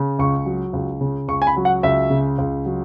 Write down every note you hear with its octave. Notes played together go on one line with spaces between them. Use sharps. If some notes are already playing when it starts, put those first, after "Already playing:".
Already playing: C#3
C#2 C#6
F#3
C#2
C#3
C#2 C#6
G#5
B5
F#3
F#5
C#2 E5
C#3
C#2
F#3